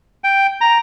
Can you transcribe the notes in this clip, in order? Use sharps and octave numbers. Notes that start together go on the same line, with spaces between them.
G5
A#5